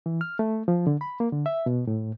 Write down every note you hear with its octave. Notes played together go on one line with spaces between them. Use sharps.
E3
F6
A3
F3
D3
B5
A#3
D3
E5
B2
A2